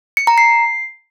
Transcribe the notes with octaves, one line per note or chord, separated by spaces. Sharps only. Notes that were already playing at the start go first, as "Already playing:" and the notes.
C#7
A#5
C7